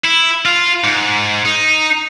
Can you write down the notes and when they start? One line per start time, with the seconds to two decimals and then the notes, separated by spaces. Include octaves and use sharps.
0.04 E4
0.45 F4
0.84 G#2
1.45 D#4